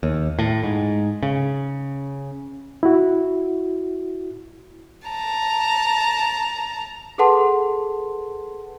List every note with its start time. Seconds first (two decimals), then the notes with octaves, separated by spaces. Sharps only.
0.03 D#2
0.39 A2
0.63 G#2
1.23 C#3
2.83 E4 F#4
5.08 A5 A#5
7.18 G#4 A4 B4 F#5 A5 C6